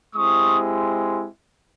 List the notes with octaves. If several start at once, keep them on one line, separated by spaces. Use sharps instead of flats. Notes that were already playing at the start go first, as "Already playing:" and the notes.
G#3 C4 E4 G4 C#6 D#6